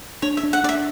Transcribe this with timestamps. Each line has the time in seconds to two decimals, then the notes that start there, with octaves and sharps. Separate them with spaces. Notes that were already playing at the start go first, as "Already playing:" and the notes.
0.22 D4 C#5
0.37 E5
0.43 D4
0.53 F#5
0.64 D4 D5
0.69 E5